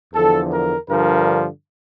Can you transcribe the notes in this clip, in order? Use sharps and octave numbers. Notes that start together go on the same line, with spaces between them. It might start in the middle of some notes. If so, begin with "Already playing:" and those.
E2 D3 F3 A4
A#4
G2 D3 F3 A#4